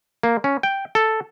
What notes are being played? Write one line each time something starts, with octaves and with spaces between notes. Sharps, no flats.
A#3
C#4
G5
A4